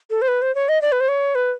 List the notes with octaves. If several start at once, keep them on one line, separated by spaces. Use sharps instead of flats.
A4
C5
B4
C5
C#5
D#5
D5
B4
C5
C#5
B4